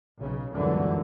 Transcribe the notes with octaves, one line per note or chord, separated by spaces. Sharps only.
B1 C#3
G1 C#2 F#2 D3 E3